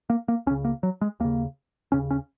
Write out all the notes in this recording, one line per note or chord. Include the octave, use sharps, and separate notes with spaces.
A#3
A#3
C#2 C#3 C#4
A#3
F#3
G#3
D#2 C#3 A#3
D#2 C#3 C#4
C#4